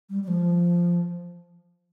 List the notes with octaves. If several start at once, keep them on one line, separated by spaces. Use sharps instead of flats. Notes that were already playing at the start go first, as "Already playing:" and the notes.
G3
G3
F3